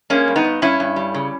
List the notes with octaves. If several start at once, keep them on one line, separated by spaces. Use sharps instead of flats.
G#3 A#3 C#4
G2
B3 D#4
G2
G2 C#4 E4
G2
G3
C#3